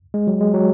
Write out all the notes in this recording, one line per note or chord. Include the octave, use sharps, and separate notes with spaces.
G#3
F#3
G#3
F#3